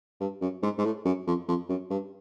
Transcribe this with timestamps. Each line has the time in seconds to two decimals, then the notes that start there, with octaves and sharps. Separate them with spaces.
0.20 G2
0.41 F#2
0.63 G#2
0.78 G#2
0.84 A2
1.05 F#2
1.27 F2
1.48 F2
1.69 F#2
1.90 G2